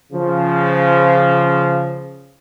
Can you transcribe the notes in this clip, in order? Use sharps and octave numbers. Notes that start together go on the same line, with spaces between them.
C#3 F3